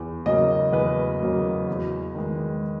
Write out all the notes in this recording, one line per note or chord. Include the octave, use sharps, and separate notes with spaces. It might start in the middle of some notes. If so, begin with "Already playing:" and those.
Already playing: E2
C#3 F#3 A#3 D#5
E2 B4
C#3 F#3 A#3
E2
D#3 G#3